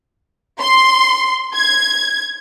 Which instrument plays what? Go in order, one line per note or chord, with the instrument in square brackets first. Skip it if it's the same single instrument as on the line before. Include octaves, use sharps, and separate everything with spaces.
[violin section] C6
G#6